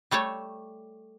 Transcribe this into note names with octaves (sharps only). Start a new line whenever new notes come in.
G3 A3 A4 C#5